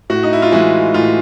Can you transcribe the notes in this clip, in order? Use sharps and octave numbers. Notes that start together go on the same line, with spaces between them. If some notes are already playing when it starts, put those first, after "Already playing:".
A2 F#4
D#4
E4
F4
E3 G#3 F#4
A2 F4